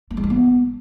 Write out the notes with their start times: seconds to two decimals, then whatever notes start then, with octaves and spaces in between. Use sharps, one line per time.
0.11 A3
0.17 G#3
0.24 E4
0.30 B3